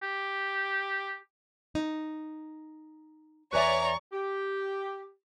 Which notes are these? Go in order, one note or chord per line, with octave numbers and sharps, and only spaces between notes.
G4
D#4
E2 B4 C#5 D5 E5 G#5 A#5 C#6
G4